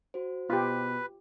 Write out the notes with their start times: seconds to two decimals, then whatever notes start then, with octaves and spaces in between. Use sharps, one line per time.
0.14 F#4 C5
0.50 B2 F4 G4 B4